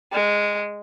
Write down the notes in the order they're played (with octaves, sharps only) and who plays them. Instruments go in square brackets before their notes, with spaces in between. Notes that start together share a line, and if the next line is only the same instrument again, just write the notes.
[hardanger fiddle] G#3